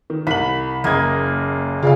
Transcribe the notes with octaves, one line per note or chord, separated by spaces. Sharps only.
D#3
C2 B5 F#7
F#1 A#3 D#5 G#6
C#3 F4 D5 F5